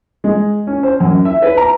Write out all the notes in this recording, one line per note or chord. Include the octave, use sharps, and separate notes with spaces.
G#3
C#4
C5
F#2
E5
B4
A#5